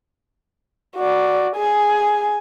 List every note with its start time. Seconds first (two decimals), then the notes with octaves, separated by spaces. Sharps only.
0.96 F#4 D5
1.56 G#4 G#5